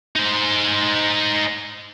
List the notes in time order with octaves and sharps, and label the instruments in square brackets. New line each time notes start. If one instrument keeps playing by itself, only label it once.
[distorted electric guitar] D#4 C5